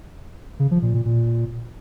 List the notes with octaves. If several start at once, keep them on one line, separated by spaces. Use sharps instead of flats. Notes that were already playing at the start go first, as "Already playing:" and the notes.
C#3
F3
A#2
A#2
A#2